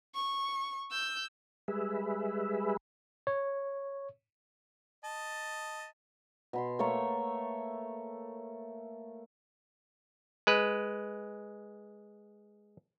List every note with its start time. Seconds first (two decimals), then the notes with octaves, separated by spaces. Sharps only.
0.15 C#6
0.91 E6 G6
1.68 G3 G#3 G#4 B4 E5
3.27 C#5
5.04 D#5 A5
6.53 B2 B5 C6
6.79 A3 A#3 C#5
10.47 G#3 B4